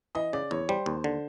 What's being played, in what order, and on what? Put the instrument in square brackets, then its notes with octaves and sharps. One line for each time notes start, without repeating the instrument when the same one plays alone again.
[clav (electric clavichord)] E3 [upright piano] D#5
[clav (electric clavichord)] C#3 [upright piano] D5
[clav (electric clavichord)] E2 [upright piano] C#5
[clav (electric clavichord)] G3 [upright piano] C5
[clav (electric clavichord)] D#2
D3